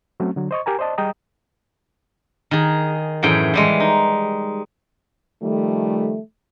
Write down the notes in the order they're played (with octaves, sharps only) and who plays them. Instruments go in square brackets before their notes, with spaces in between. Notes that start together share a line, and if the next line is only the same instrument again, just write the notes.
[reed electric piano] F#3 A3 C4 C#4
D3 F#3
C5 D#5 C#6
G4 A#4 G#5 A#5
C5 D5 D#5 A5
G3 G#4 D#5 G5 A#5 D#6
[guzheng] D#3 G#4
F#2 A2 E3 G#4 G5
E3 G3 G#3
D#4
[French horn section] D#3 F3 G3 A3